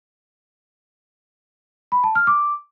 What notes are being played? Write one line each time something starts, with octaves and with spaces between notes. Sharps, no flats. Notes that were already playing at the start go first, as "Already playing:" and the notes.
B5
A5
F6
D6